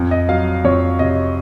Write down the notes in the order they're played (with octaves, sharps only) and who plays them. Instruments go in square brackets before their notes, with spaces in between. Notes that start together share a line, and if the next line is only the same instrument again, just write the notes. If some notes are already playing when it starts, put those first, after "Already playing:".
Already playing: [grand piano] F2
D#5
F#3 F5
F2 C#5
C3 D#5